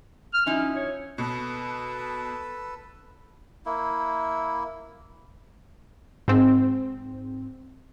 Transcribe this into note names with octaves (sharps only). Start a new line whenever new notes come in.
F6
F3 C#4 D#4 E4
C#5
B2 A4 B4
A#3 E4
G#2 C4